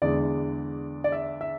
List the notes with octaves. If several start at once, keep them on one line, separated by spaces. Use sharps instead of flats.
E2 D3 G#3 D5
D5
E5
E5